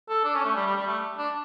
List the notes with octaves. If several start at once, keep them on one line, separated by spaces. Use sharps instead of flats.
A4
D4
C#4
A3
G3
G3
G3
A3
D4